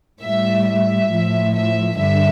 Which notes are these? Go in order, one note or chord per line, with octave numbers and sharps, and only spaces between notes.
A2 G3 E5
E5
A2 F3
E5
G2 D3 E5